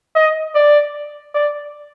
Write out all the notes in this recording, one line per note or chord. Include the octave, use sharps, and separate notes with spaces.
D#5
D5
D5